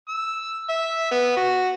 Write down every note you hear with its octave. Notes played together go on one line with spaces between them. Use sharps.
E6
E5
B3
F#4